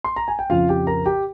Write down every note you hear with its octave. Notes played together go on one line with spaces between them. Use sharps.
C6
A#5
G#5
G5
F2 C#3 F3 F4 F5
G4 G5
A#4 A#5
G4 G5